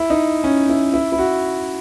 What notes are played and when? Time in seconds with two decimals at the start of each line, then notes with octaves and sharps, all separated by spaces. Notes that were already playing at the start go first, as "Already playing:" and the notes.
Already playing: E4
0.10 D#4
0.44 C#4
0.69 E4
0.93 E4
1.12 E4
1.18 F#4